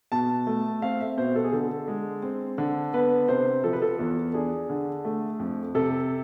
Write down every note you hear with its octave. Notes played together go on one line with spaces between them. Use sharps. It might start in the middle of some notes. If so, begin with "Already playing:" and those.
B2 A5
A3
C4 F5
E5
B2 C5
A4
G#4
D3 A4
G#3
C4
D3
B3 B4
C3 C5
F3 A4
B4
A4
E2
D4 G#4
D3
A3
F2
C3 A4